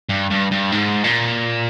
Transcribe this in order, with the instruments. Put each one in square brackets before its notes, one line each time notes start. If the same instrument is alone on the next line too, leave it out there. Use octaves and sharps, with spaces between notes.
[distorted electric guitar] G2
G2
G2
G#2
A#2